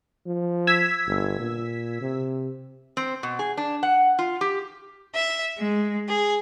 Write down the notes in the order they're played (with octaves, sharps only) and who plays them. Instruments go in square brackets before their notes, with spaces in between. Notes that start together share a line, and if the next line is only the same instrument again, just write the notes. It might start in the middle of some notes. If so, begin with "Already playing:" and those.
[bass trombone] F3
[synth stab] E6 G#6 B6
[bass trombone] G1
A#2
C3
[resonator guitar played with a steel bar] C4
B2
G#4
D4
F#5
F4
G4
[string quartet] E5
G#3
G#4